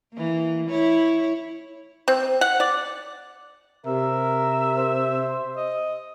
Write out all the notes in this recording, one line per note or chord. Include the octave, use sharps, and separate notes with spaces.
E3 A#3
E4 C#5
C4
F#5
D5
C3 A#4 E5
C5
D#5